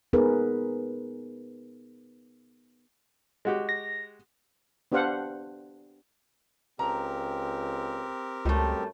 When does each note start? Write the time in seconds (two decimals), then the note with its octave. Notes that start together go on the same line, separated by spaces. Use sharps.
0.13 B3 D#4 G#4 A#4 B4
3.45 G#3 F#4 G4
3.69 A#6
4.92 B3 D4 G4 C5 F5 F#5
6.79 C#2 C4 G4 A#4 A#5
8.45 C#2 F#2 G3 A3